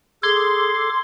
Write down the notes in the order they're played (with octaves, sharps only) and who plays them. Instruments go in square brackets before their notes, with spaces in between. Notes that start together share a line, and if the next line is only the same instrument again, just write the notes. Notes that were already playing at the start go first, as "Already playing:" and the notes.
[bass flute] G#4 [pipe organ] A4 D6 [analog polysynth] C6 [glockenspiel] G#6